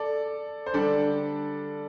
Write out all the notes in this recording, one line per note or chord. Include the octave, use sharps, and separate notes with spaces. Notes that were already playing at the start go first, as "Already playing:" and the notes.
Already playing: A4 D5
C5
D3 G3 D4 A4 D5